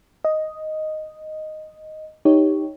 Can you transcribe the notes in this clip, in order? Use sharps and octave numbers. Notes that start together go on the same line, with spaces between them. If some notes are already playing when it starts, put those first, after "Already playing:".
D#5
D#4 G4 C#5